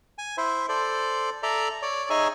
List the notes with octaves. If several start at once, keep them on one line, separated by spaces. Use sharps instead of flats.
G#5
E4 C5 E5
A4 C5 D5
A4 D5 E5 A#5
C#5 D5
D#4 G#4 C#5 D#5 E5 G#5